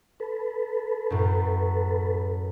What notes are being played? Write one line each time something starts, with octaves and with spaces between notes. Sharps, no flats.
A4 B4
F#2 A2